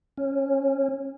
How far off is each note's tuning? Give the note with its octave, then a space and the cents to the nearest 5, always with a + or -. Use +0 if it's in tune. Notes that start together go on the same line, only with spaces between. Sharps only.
C#4 -20